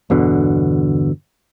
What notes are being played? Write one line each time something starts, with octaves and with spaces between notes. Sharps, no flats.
G1 E2 B2 D3